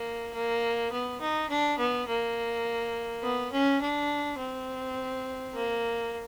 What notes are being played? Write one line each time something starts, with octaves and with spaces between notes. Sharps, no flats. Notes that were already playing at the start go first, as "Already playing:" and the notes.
Already playing: A#3
A#3
B3
D#4
D4
B3
A#3
B3
C#4
D4
C4
A#3